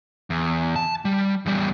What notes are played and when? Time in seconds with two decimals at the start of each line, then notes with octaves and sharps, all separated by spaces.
0.30 E2
0.76 A5
1.05 G3
1.46 E2 G3